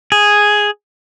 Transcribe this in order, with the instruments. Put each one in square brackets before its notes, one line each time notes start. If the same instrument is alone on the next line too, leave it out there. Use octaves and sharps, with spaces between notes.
[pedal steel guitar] G#4